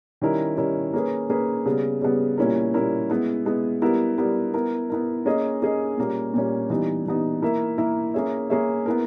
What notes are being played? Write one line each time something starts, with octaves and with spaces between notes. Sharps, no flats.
D#3 G3 C#4 E4 A#4
D#3 G3 C#4 E4 A#4
A#3 C#4 G#4 B4
A#3 C#4 G#4 B4
C#3 G3 B3
C#3 G3 B3
A#2 G3 C#4 E4 A#4
A#2 G3 C#4 E4 A#4
G#3 B3 E4
G#3 B3 E4
G3 B3 E4 A#4
G3 B3 E4 A#4
B3 E4 A#4
B3 E4 A#4
A#3 C#4 G#4 D#5
A#3 C#4 G#4 D#5
A#2 G3 A#3 C#4
A#2 G3 A#3 C#4
E3 G3 B3 D#4
E3 G3 B3 D#4
A#3 E4 A#4 E5
A#3 E4 A#4 E5
A#3 C#4 G#4 C#5 E5
A#3 C#4 G#4 C#5 E5
B3 E4 A#4